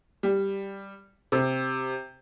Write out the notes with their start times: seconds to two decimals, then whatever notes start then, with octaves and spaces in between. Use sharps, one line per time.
0.23 G3
1.32 C3